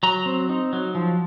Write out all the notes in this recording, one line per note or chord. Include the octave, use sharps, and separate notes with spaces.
F#3 A#5
C4
D#4
F#3
F3